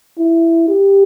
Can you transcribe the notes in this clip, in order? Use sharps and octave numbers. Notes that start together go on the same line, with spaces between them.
E4
G4